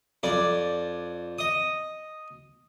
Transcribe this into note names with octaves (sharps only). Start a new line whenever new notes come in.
F2 D5
D#5 D#6